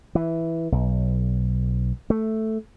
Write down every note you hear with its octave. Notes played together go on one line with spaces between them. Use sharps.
E3
B1
A3